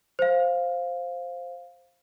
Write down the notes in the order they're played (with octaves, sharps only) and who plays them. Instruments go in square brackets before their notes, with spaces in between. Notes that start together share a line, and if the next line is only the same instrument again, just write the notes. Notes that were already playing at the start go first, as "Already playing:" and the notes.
[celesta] C5 F5